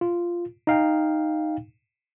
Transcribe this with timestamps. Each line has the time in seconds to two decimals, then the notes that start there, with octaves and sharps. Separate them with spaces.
0.01 F4
0.67 D#4 F5 G5